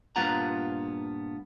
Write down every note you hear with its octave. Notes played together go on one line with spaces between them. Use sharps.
G2 A#2 B3 F4 F#5 A#5